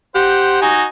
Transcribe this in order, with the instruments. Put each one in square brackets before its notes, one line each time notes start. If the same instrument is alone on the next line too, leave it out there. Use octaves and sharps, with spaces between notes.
[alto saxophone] G4 [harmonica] C5 F#5
[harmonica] D#4 F#4 G#5